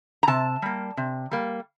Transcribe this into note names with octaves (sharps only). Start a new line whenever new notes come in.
A#5
C3 A5
G3 A#3
C3
G3 A#3